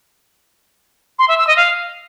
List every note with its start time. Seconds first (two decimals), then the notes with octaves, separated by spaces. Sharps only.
1.19 C6
1.28 E5
1.38 E6
1.47 D#5
1.57 F5